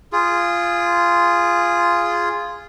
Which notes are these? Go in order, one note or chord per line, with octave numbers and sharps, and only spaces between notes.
F4 G#4